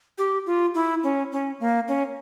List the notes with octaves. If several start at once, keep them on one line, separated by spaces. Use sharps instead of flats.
G4
F4
E4
C#4
C#4
A#3
C#4